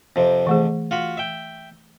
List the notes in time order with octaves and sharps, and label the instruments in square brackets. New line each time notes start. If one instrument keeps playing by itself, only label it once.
[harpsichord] F2 C3
[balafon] E3 A3 G#4
[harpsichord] F4 F#4 B5
E5 G5